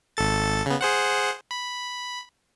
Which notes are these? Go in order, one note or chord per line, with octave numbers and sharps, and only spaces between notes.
G#1 A4 A6
C#3 B3
G#4 C5 F#5
B5